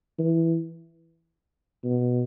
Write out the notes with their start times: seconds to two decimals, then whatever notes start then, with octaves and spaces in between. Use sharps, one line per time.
0.19 E3
1.84 B2